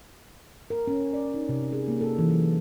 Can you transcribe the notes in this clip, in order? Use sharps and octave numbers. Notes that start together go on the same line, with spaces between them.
A#4
C#4
D5
D#4
C3
G#4
A#3
A4
E3
F#3